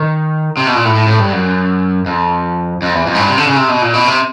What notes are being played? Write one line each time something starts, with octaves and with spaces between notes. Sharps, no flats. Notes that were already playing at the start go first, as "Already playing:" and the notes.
Already playing: D#3
C3
B2
A#2
A2
A2
A2
G2
F#2
F2
F2
E2
F2
G#2
G2
C3
D3
C#3
C3
B2
A#2
B2
C3